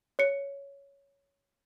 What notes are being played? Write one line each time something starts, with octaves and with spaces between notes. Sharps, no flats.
C#5 C#7